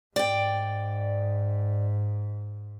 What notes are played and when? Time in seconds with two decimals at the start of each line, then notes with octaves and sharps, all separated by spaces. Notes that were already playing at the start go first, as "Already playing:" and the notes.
0.16 G#2 D5 G5